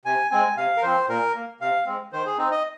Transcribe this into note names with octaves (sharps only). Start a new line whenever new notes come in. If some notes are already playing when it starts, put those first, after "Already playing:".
C3 G#5
G#3 C4 G#5
C3 F5
A#4
F3 C4 C5
A#2 A#4
A#3
C3 F5
G#3 C4
D#3 C5
G#4
C4 D#4
D#5